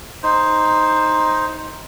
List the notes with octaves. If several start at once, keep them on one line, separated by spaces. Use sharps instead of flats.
D#4 C5